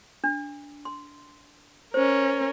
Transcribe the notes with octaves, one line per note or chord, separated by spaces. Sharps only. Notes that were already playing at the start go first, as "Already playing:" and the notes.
D4
C6
C#4 A#4 C5